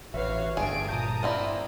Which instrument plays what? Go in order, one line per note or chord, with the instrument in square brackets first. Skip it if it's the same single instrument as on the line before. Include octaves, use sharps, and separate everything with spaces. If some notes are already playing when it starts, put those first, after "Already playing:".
[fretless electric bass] A1 [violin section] F#4 C#5 F5 [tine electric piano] B4 E5
[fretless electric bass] G1 G2 [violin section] A3 G#5 D7 [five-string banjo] G#4
[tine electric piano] A#2 G6 [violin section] A5 A#5 D#6
[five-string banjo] A#3 C4 E4 [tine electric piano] D5